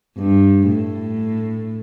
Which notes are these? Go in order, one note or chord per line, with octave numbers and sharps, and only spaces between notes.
G2
A2